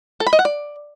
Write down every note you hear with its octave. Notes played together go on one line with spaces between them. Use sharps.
A4
B5
D#5
F#5
D5